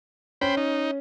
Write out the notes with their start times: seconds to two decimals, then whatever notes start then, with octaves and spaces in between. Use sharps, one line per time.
0.41 C#4 C5 G5 B5
0.57 D#4